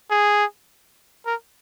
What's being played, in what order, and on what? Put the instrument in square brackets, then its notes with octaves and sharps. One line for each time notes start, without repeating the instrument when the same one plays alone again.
[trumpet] G#4
A#4